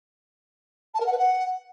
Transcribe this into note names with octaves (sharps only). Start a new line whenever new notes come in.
A5
A#4
F#5
B4
F#5